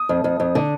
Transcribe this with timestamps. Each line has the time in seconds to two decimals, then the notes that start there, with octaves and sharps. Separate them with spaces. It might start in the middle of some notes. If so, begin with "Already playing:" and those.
Already playing: D#6
0.09 F2
0.24 F2
0.40 F2
0.55 D3